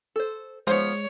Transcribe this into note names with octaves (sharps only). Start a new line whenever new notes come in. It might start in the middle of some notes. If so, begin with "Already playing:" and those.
A4 C5
F3 G#3 B3 C5 C#5